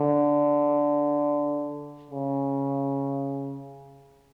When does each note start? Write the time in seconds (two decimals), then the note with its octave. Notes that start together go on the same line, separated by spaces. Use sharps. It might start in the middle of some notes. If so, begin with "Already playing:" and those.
Already playing: D3
2.11 C#3